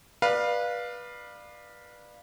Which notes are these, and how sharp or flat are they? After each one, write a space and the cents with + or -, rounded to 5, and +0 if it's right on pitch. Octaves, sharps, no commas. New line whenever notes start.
B4 -20 D5 +25 F5 +0